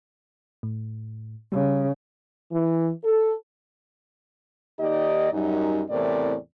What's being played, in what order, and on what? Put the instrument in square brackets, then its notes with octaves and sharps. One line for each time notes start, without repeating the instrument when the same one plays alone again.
[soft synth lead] A2
[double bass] C#3 [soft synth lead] G3
[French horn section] E3
A4
D#2 D#4 G4 D5 D#5
F#2 G3 D#4
E2 A2 C3 C4 A#4 D5